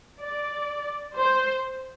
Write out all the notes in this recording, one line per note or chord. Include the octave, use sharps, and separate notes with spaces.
D5
C5